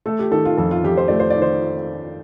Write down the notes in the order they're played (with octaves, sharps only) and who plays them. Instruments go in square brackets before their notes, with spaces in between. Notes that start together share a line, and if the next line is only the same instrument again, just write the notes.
[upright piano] A3 A4
G4
D#3 A4
F4
F2 A4
F4
F2 G4
C5
A3 D5
C5
D5
D#3
C5